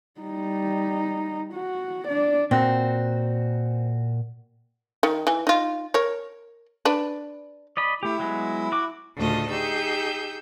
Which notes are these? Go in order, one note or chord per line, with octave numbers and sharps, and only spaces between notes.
G3 D#4
F#4
D4 D5
A#2 C4 F#4
D#3
E3
D#4 F4
A#4 C#5
D4 B4
D5 D#5 B5
A3 E4 G4
F#3 G#3 B3
F#4 D6
D2 A2 C#3 F4 A4 D#5
D#4 G4 G#4 E6 G6